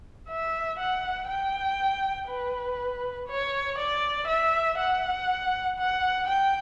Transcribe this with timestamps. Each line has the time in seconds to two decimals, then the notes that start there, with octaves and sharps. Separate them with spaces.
0.29 E5
0.79 F#5
1.28 G5
2.28 B4
3.28 C#5
3.78 D5
4.27 E5
4.78 F#5
5.78 F#5
6.28 G5